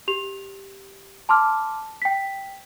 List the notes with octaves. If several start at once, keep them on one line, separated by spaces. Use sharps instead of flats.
G4 F7
A5 C6 D6 F6
G5 B6